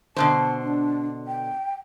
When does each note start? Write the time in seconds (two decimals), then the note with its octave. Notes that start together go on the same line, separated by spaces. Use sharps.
0.16 B2 D3 C5 A5
0.61 D4
1.27 G5